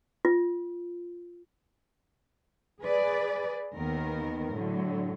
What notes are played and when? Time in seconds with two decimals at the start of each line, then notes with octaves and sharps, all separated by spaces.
0.25 F4
2.83 G#4 B4 D5
3.75 D#2 D#3 B3 A#4
4.54 A2 D3 F#3